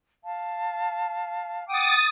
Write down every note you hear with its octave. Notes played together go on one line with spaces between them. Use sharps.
F5 A5
F#5 G5 D6 D#6 A6